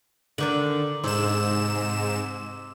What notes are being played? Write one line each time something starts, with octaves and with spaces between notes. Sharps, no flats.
D3 D#3 D4 D6 F#7
G#2 C3 C6 E6 E7